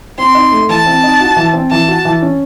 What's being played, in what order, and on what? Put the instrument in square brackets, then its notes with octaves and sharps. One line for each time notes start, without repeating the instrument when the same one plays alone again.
[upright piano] C4 [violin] C6
[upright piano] D#4
A3
[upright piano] E3 [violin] A5
[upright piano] C4
D#4
F#4
E3
C4
[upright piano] E3 [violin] A5
[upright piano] F#4
E3
C#4